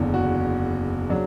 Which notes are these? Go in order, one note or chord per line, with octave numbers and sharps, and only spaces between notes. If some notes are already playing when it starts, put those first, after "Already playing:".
Already playing: F#1 E2 D3
F#4
C#3 F#3 D4